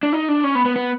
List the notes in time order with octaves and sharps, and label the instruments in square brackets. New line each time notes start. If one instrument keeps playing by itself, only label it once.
[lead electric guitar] D4
D#4
D4
C#4
B3
B3
B3